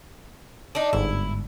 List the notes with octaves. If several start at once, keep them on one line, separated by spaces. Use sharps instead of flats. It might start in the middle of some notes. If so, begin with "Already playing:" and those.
D4 D#4
G1 G#2 E4